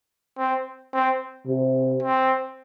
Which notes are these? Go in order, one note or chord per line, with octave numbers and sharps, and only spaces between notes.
C4
C4
C3
C4